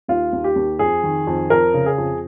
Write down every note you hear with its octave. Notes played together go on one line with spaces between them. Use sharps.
D#2 F4
D#2
G4
D#2
F2 G#4
D#3
F2
F2 A#4
C#3
G#4
F2